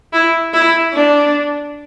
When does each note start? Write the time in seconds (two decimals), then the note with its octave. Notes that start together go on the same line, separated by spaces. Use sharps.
0.13 E4
0.53 E4
0.94 D4